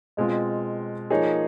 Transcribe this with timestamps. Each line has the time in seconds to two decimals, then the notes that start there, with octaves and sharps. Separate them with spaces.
0.17 B2 G#3 C4 F4
1.10 F3 A#3 D#4 G#4 C#5